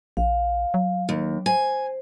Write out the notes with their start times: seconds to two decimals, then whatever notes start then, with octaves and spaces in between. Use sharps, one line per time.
0.17 A#1 F5
0.74 F#3
1.09 D#2
1.46 C5 G#5